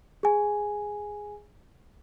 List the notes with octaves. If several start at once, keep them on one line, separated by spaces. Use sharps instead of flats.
G#4 G#5